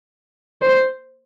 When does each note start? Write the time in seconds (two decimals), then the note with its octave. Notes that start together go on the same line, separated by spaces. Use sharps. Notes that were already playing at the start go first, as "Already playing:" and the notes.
0.62 C5